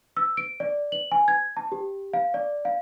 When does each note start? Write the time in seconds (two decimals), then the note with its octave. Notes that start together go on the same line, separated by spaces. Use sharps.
0.17 E6
0.37 D7
0.60 D5
0.92 F#7
1.12 G#5
1.28 G#6
1.57 A5
1.72 G4
2.13 F5
2.34 D5
2.65 F5